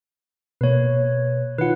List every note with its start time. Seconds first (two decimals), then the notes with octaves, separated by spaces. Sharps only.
0.61 B2 A#3 B4 C#5
1.59 D#3 F4 B4 F#5